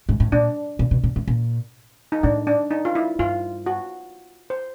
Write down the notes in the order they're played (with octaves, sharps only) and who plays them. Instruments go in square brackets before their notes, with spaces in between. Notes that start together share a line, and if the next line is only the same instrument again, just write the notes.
[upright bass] G#2
A2
[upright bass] A#2 [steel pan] D4
[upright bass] A#2
B2
A#2
A2
A#2
[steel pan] D#4
[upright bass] A2 [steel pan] D4
[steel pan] D4
D#4
F4
E4
[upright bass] G2 [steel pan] F4
[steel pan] F#4
C5